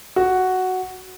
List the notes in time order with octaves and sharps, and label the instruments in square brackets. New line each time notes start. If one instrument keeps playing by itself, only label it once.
[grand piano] F#4